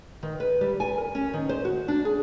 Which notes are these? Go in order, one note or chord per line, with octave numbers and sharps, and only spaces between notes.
D#3
B4
G3
G#5
A#4
C#4
D#3
C5
F#4
D4
G#4